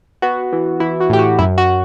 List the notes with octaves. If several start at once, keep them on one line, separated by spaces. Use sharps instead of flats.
B3 F#4
E3
E3 E4
F#4
A2 G4
F#4
F#2 E4
F#4